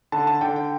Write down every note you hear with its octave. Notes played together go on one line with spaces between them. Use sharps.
D3 A5
A5
D3 G5
G5